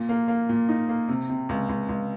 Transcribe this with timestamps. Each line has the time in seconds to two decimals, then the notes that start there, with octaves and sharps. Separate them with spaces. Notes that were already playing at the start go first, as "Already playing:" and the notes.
Already playing: A#2
0.09 A#3
0.28 A#3
0.49 A#2
0.69 D#4
0.89 A#3
1.09 C3
1.30 C3
1.49 C#2
1.69 C#2
1.89 C#2